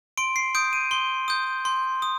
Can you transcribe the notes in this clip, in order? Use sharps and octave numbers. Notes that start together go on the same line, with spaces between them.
C6 D7
C7
D#6 G6 D7
D#7
C6 G7
D#6 G6
C6
D#6